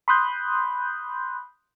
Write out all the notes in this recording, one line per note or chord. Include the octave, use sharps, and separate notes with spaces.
B5 C6 D#6 F#6 G6